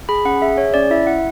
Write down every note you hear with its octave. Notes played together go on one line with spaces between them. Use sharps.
G#4 B5
C#4 F#5
G#4 E5
G#4 C#5
C#4 D5
E4 E5
E4 F#5